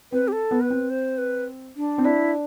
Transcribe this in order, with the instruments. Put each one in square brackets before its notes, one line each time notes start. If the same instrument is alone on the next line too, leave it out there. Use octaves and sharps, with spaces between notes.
[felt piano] C4 [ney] B4
[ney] G4
A4
[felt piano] B3
[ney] B4
[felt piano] C4
[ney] C5
B4
D4
[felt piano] C4
[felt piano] D4 [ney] E4